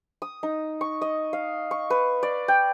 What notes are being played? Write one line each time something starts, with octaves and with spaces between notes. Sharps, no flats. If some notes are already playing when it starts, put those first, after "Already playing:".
D#6
D#4
C#6
D#5
F5
C#6
B4
D5
G5